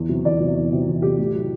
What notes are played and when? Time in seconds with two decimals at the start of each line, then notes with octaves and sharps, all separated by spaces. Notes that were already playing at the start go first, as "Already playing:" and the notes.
Already playing: E2
0.09 C3 F#3
0.24 E2 D5
0.40 C3 F#3
0.56 E2
0.72 C3 F#3
0.87 E2
1.02 C3 F#3 G4
1.18 A2
1.35 F#3